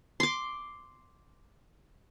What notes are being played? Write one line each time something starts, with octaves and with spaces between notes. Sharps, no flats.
C6 D6